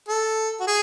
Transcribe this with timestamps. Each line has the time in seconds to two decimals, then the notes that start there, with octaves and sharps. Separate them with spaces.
0.08 A4
0.60 F#4
0.67 G#4